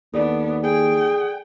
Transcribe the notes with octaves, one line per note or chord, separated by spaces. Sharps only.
D#2 B3 D4 A4 D5
G#4 G5